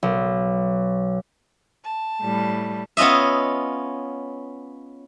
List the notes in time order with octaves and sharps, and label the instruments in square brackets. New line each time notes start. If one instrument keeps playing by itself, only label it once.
[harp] B1
[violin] A5
[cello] A2 G3
[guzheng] B3 C#4 F4 D#5 E5